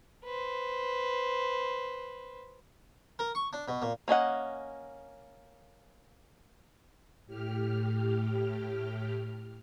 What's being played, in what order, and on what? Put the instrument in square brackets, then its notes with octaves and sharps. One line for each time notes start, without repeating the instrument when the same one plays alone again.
[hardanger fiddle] B4 C5
[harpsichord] A#4
C#6
D4
B2
A#2
[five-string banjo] A#3 C#4 D#5 F#5
[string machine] A2 G4 F6